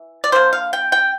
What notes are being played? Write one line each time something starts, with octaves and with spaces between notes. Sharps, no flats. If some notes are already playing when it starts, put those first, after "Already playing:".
Already playing: E3
D5
D3 G3 A#3 C5
F5
G5
G5